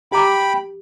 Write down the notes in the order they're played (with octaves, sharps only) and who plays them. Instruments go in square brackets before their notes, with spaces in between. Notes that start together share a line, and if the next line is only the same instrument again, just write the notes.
[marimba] G4 A#5 D6 [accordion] G5 B5